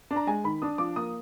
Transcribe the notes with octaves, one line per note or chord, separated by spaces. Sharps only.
D4
A#5
G#3 G#5
D#3 B5
D4 D#6
F3 D6
A#3 D#6